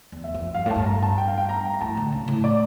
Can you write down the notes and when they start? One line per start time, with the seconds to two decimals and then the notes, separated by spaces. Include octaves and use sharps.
0.12 E2
0.24 E5
0.34 F2
0.54 G2 F5
0.66 A2
0.70 A5
0.76 G2
0.86 A#5
1.03 A5
1.18 G5
1.28 F5
1.38 G5
1.49 A#5
1.74 A#5
1.81 A2 A5
1.97 D3
2.12 C#3
2.28 A2
2.44 D5